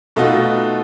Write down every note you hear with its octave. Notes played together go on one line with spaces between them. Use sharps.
B2 A3 D#4 F4 F#4